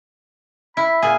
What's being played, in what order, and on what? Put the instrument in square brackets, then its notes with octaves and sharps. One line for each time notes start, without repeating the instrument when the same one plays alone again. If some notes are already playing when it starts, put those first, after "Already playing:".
[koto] E4 [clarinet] B5
[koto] A#2 G#4 [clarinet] G#5